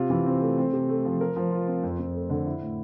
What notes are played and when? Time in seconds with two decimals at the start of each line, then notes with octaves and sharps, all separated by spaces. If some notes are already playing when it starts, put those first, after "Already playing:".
Already playing: C3 F4
0.10 E3
0.26 C4
0.42 A3
0.58 C4
0.73 C3
0.89 A3
1.05 F3
1.21 A#4
1.36 F3
1.51 F4
1.67 C4
1.83 F2
1.99 F2
2.15 A3
2.30 D3
2.46 E4
2.61 A2